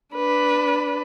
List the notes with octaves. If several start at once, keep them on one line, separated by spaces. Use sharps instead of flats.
D4 B4